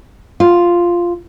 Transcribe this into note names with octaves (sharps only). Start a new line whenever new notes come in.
F4